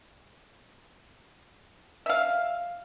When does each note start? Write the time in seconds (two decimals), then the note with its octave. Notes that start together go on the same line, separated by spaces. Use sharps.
2.06 E5 F5